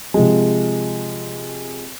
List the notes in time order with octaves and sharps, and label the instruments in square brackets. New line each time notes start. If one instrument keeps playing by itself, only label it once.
[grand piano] C3 F3 G#3